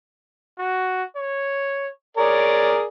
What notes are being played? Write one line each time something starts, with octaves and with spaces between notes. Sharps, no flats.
F#4
C#5
G#4 A#4 C#5 D5